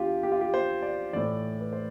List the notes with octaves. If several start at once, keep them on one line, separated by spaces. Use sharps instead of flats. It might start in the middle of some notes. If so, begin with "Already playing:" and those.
Already playing: E2 D4 F4 G4
G4
F4
G4
C5
D5
A2 E3 D5
B4
C5